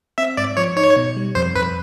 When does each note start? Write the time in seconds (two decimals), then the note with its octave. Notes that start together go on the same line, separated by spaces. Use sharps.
0.18 C4 E5
0.37 G#2 D5
0.57 F3 C#5
0.76 D#4 C#5
0.96 B2
1.17 G3
1.35 F2 C5
1.55 F2 B4